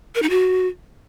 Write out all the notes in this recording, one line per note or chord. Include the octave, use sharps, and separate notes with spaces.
A#4
D#4
F#4